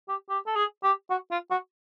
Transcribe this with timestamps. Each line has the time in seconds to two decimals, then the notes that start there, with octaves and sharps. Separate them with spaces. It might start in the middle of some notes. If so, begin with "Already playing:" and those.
0.09 G4
0.30 G4
0.47 A4
0.56 G#4
0.83 G4
1.10 F#4
1.31 F4
1.51 F#4